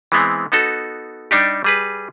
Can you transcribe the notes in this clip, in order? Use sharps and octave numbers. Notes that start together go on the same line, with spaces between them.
E3 G#3 B3 C4
B3 D#4 F#4 A4
G3 D4 D#4 G4
G3 G#4 B4